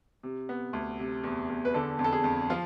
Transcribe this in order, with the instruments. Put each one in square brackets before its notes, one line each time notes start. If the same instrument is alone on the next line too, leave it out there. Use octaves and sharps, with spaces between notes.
[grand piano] C3
B3
D2
C3
E2
E2
B4
D3 A4
F2
A4
G#4
F2
F3 F4